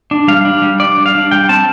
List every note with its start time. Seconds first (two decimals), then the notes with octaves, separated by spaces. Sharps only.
0.11 D4
0.28 G3 F5
0.45 D4
0.62 G3
0.80 D4 D5
0.98 G3
1.06 F5
1.15 D4
1.31 G3 G5
1.49 C4 A5